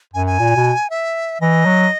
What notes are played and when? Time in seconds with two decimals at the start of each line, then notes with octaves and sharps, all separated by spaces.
0.13 F#2 G#5
0.26 G#5
0.39 A#2
0.57 B2
0.90 E5
1.41 E3 D#5
1.65 F#3